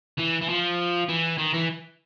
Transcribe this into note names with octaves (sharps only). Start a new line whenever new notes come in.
E3
E3
F3
E3
D#3
E3